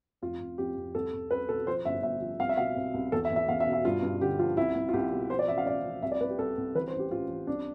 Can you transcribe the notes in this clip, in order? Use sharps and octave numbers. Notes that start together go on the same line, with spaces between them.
F1 F4
F1
F2 G4
F1
C2 A4
C2
C2 B4
B2 A4
F3 C5
G1 E5
G1 E5
F3
C2 F5
E5
B2 F5
C2
C2
E2 A4
E5
E2
E5
E2 F5
E5
B2
E5
G2 F4
G2
D3 G4
F3 F4
C2 E4
C2
F4
C2 G4
B2
F3 C5
D5
A1 E5
F5
A1 D5
F3
C2 E5
D5
C2 B4
G4
C2 A4
C2
E3 B4
C5
A1
G4
A1 F4
A1
C2 D4